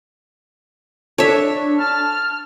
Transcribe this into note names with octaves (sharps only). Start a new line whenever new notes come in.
D4 A4 C#5 E5
A5 F6